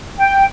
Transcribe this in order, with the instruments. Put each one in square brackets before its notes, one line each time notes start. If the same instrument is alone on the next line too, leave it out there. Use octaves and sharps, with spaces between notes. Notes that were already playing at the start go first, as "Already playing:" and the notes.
[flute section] G5